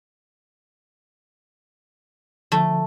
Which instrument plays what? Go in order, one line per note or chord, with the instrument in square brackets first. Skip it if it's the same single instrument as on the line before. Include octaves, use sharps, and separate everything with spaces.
[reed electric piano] D3 F3 [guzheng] A3